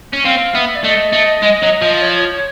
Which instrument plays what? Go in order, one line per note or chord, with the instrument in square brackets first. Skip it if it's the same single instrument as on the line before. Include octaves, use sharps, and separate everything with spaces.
[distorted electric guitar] C#4
[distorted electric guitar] C4 [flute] F5
[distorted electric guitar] B3 [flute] E5
[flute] D5
[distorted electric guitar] A3 [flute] D#5
[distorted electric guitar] A3
G#3
F#3
F3
[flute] C#5